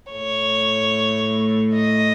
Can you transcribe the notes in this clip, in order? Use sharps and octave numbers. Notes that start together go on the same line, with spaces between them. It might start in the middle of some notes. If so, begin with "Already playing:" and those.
A2 A3 C#5
D#5